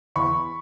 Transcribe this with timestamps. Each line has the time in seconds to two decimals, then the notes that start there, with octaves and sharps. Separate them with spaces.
0.16 E2 B5 C#6